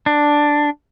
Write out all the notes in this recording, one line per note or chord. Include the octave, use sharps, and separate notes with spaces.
D4